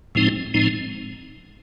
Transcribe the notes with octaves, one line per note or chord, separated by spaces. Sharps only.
A2 F3 G#3 C4 D#4
A2 F3 G#3 C4 D#4